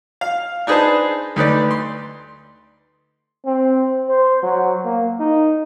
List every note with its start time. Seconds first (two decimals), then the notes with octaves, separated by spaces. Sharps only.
0.21 F5
0.67 D4 D#4 G#4 B4 C5 A5
1.36 D2 D#4 B4 D5
1.71 C6
3.45 C4
4.09 C5
4.43 F#3
4.85 A#3
5.20 D#4